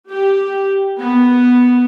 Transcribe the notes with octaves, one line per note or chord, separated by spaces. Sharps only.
G4
B3